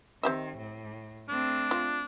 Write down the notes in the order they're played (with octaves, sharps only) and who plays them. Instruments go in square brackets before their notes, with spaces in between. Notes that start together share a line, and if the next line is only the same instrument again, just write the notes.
[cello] D#3 [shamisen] C4 G4 E5
[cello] A2
[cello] A3 C4 [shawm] D4
[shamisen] F4